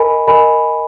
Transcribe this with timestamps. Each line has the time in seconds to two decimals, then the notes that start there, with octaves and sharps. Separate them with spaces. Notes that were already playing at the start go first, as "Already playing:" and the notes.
Already playing: A#4 D#5 G#5 B5
0.27 A#4 D#5 G#5 B5